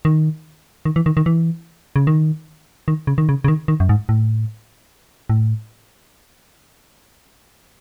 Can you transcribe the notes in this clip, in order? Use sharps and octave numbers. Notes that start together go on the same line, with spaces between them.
D#3
D#3
E3
D#3
D#3
E3
C#3
D#3
D#3
C#3
D#3
C#3
C#3
D#3
D#3
F#2
G#2
A2
A2